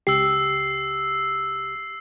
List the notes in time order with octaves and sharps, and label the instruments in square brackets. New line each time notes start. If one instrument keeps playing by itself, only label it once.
[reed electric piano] C#2 G4 [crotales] E6 C7